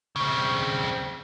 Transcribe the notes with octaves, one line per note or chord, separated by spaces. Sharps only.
C#3 C4